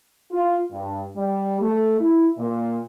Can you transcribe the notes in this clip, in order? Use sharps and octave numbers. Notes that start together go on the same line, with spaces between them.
F4
G2
G3
A3
E4
A#2